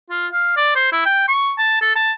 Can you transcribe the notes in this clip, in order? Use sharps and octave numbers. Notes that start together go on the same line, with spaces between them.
F4
F5
D5
C5
E4
G5
C#6
A5
A4
A5